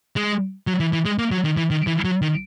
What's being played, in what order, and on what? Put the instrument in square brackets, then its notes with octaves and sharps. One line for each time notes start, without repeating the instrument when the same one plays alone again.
[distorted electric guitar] G#3
F#3
E3
E3
G#3
A#3
F#3
D#3
E3
D#3
E3
F#3
D#3